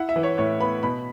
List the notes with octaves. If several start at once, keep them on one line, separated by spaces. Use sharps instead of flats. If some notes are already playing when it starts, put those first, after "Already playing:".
Already playing: E4 F#5
E5
E3
C#5
A2 C#5
B3 B5
B2 B5